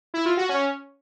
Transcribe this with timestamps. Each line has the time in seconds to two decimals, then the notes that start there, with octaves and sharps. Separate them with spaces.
0.14 E4
0.25 F4
0.37 F#4
0.49 C#4